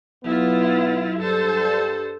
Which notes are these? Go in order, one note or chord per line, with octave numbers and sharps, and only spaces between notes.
B1 F#3 B3 E4 F4
G2 A4 C5